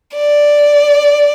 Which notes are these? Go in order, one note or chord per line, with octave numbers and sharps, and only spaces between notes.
D5